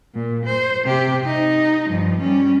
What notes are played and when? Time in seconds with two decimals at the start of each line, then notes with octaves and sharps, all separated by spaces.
0.15 A#2
0.46 C5
0.86 C3 G4
1.24 D#4
1.87 G2 F3
2.21 G3 C#4